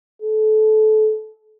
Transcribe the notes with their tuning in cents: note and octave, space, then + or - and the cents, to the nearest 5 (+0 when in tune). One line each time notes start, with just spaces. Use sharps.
A4 -25